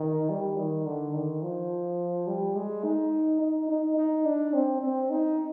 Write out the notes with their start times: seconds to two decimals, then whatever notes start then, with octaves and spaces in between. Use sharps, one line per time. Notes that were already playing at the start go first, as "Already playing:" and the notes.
Already playing: D#3
0.30 G3
0.58 D#3
0.86 D3
1.14 D#3
1.43 F3
2.27 G3
2.56 G#3
2.84 D#4
3.41 D#4
3.69 D#4
3.97 D#4
4.25 D4
4.54 C4
4.82 C4
5.10 D#4